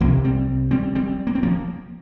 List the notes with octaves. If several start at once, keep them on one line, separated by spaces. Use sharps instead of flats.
C2 C3 F3 A#3
G3 C4
G3 C4
G3 C4
A#3
C4
F3 A#3